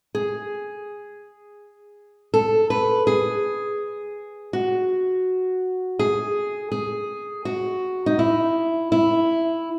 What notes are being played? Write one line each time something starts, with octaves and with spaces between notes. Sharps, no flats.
G#4
A4
B4
G#4
F#4
G#4
G#4
F#4
D#4
E4
E4